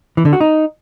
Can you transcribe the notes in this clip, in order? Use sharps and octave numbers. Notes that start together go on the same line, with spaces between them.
E3
D3
F#4
D#4